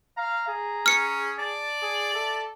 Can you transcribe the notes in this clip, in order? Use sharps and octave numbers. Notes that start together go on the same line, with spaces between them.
F5 A#5
G#4
C#4 F6 C#7
D5 A5
G#4
A4 E5